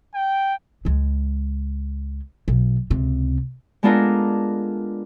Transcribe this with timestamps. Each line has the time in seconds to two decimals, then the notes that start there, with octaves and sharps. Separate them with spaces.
0.15 G5
0.85 C#2 G#3
2.48 B1
2.90 C#2 C3
3.83 G#3 B3 D4 F4 A4 A#4